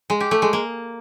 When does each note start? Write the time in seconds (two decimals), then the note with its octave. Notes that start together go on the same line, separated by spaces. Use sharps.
0.10 G#3
0.20 G4
0.31 A3
0.42 G#3
0.53 A#3